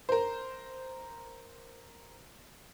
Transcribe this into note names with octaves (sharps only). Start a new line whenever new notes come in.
A#4 C5